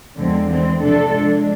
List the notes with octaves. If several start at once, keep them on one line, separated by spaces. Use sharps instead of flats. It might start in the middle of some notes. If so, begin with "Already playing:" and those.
E2 D3 F3 G#3 C4
E3 G#3 C4
C3 F3 A3 D4 A4
F3 G#3 D4